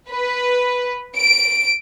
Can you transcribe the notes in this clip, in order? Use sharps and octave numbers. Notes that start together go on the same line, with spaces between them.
B4
D7